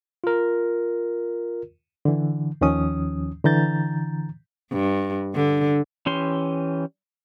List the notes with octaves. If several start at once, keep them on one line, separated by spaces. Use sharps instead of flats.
F4 A#4
D3 E3
D#2 D#3 F3 C#4 D#6
D3 E3 A#5 G6 A6
G2
D3
E3 C#4 G4 C6